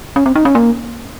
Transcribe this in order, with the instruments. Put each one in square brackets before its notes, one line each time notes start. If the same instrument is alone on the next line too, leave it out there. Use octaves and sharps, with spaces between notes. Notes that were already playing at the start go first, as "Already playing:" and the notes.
[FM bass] C#4
C4
D#4
C#4
A#3